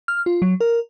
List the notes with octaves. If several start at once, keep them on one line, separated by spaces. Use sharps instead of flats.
F6
F4
F#3
A#4